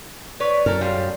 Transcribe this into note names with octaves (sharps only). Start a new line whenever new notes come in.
B4 C#5 D5
F#2 A4 A#4
A2 G3 F4